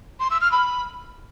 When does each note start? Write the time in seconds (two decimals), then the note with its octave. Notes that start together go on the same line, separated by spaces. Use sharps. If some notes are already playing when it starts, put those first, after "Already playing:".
0.20 C6
0.31 E6
0.41 F6
0.52 B5